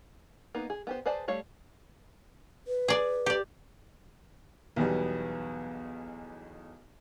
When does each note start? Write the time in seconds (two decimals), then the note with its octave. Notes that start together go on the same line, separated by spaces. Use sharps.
0.55 A#3 B3 D#4
0.70 G#4
0.87 B3 G4 C5
1.06 G#4 B4 C5 D5 A5
1.28 G3 A3 C#5 F5
2.68 B4
2.88 G#4 D5
3.26 G4 D5
4.76 B1 E2 B2 G3 B3